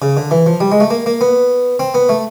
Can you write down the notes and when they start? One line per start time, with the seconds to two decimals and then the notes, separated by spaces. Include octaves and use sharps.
0.02 C#3
0.17 D3
0.31 E3
0.46 F3
0.61 G3
0.72 G#3
0.80 A3
0.90 A#3
1.06 A#3
1.21 B3
1.79 C4
1.94 B3
2.09 A3